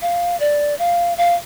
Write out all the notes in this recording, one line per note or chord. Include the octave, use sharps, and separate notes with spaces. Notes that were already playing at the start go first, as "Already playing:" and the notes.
F5
D5
F5
F5